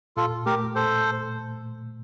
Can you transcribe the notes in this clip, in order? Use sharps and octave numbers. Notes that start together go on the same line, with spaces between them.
A#2 F4 A4
A3 G4 A#4
A#2 A4 C5